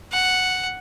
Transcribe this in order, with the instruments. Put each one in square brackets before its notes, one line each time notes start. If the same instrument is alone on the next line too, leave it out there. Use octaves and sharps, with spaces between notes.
[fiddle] F#5